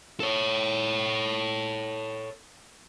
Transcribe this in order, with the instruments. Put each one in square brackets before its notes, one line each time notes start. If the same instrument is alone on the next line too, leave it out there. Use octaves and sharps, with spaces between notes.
[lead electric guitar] A4 C#5